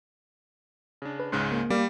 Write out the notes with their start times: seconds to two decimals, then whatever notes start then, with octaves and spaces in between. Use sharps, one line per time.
1.02 C#3 D4
1.19 B4
1.32 C#2 G#2 C#3 C6 F#6
1.52 A#3
1.70 G3 A#3 F5 D6